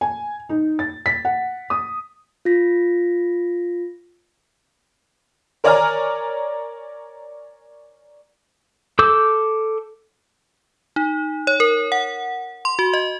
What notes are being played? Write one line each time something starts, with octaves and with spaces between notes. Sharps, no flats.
G#5
D#4
A6
B6
F#5
D#6
F4 A#6 B6
A#4 C#5 D5 G#5 A#5 F6
A4 D6 E6 G6
D#4
C#5
A#4
F#5
C6
F#4
D#5